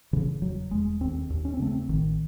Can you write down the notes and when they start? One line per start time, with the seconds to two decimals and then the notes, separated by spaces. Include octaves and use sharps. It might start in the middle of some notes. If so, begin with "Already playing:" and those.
0.13 C#3 E3
0.41 E1 F#3
0.71 E1 G#3
1.01 D#2 C4
1.30 D#2
1.45 C#4
1.54 C4
1.59 C#3 A3
1.71 C4
1.89 A1 D#3